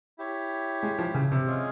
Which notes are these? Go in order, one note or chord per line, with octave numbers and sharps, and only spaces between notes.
E4 G4 C#5
G#3
F3
C#3
C3
G#3 C#4 F4 G#4